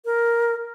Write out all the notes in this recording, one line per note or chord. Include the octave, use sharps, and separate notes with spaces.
A#4